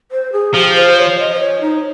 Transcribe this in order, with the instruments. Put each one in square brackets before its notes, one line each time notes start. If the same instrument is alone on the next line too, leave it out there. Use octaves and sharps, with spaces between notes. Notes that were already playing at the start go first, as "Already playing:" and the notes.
[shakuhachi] C5
G#4
[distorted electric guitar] F3 [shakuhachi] G4
[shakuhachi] C5
C#5
D#5
C5
C#5
D#4